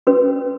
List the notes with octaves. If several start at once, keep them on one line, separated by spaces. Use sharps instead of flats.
C#4 F#4 B4